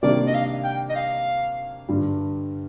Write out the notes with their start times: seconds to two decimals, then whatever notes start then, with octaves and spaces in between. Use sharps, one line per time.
0.03 C3 D#3 G3 A#3 D4 D5
0.27 D#5
0.34 F5
0.64 G5
0.90 D#5
0.96 F5
1.89 G2 D3 G3